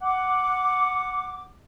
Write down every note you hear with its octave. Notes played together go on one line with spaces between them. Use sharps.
F#5 D6